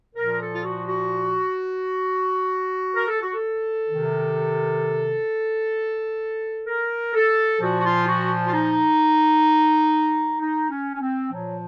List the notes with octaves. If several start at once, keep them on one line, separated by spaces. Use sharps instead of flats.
A#2 F3 A#4
A4
F4
F#4
F#4
A#4
A4
F#4
A4
C3 D#3
A#4
A4
A#2 F3 F#4
F#4
F4
F#4
F4
D#4
D#4
C#4
C#4
C4
A#2 F3 F#3